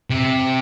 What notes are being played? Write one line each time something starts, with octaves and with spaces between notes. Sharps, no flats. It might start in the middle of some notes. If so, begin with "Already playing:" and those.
C3